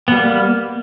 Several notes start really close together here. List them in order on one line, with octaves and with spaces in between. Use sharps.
B3 G3 A#3